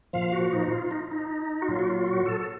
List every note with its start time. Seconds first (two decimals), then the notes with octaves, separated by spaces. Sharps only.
0.13 A#2 F3 F5
0.32 F#4
0.53 D#4
0.71 F4
0.91 D#4
1.11 D#4
1.62 F#4
1.68 A#2 F#3 F4
1.79 F#4
1.88 F4
2.07 F#4
2.26 A4
2.40 A4